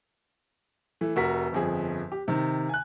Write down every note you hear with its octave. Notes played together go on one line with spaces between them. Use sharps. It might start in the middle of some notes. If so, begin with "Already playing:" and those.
E3 A3
F1 F#4 A#4 B6
G1 F2 G#4
G4
C3 D#3
G#5 F#6